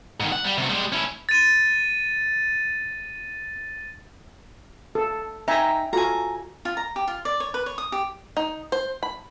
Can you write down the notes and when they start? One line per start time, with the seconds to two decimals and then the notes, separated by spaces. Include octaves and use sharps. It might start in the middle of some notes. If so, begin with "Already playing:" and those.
0.20 G#2 D#3
0.32 F#5
0.44 G3
0.58 C3 F#4
0.69 G3 G#3
0.92 C#4 E4
1.29 A6 D#7
4.95 A4
5.48 D#4 E5 G5 G#5 A#5
5.93 F4 F#4 A4 G#5 A#5
6.65 F4
6.77 A#5
6.96 G4
7.08 F4
7.25 D5
7.40 C#5
7.54 B4
7.66 C#5
7.78 D#6
7.92 G4
8.37 D#4
8.72 C5
9.03 B5